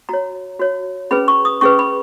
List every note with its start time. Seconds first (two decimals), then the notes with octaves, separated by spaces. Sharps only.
0.09 F#4 C#5 A#5
0.60 F#4 C#5
1.11 C#4 G#4 B4 B5
1.28 C#6
1.45 D#6
1.61 C#4 G#4 B4 C#6
1.79 B5